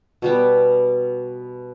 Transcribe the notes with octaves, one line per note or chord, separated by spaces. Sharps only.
B2 G3 B3